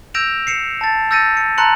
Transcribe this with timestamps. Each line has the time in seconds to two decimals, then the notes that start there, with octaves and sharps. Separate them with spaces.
0.14 E6 G6 A#6 D7 E7 F7
0.47 C7 C#7 E7
0.81 A5 A6
1.11 E6 G6 A6 A#6 C#7 D#7
1.37 C#7
1.58 A5 A#5 C6 F#6 C#7 F#7